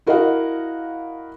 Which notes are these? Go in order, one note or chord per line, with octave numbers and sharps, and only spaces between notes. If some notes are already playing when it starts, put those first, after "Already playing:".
E4 F#4 A#4 D#5 F5 F#5